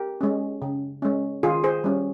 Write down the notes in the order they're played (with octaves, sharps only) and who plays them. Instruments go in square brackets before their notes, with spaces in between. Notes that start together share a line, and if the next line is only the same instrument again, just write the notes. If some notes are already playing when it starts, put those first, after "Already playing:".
Already playing: [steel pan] G4 A#4
G#3 C#4
C#3
G#3 C#4
D#3 F4 G#4
G#4 C5
G3 C#4